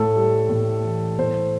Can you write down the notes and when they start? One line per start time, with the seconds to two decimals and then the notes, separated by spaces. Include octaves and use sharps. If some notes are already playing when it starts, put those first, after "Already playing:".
Already playing: A2 A4
0.15 G3
0.49 A2
0.83 E3
1.19 A2 C5